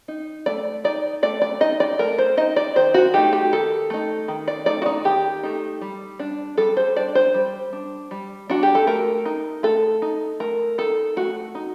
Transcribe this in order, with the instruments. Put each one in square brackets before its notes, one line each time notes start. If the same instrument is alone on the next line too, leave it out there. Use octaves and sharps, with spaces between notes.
[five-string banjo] D#4
A3 D5
D#4 D5
A3 D5
D5
D#4 D#5
D5
A3 A#4
C5
D#4 D#5
D5
D#3 C5
F#4
A3 D#4 G4
G4
D#3 A4
A3 D#4
D#3
D5
A3 D#4 D5
F#4
D#4
D#3 G4
A3 D#4
G3
D4
G3 A4
C5
D4 D5
C5
G3
D4
G3
D4 F#4
G4
A4
A3 A#4
D#4
A3 A4
D#4
A3 A#4
D#4 A4
A3 F#4
D#4